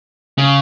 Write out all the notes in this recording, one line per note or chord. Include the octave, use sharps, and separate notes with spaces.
C#3